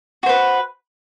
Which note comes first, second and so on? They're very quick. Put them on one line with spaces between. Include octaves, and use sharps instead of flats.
F#4 C5 B4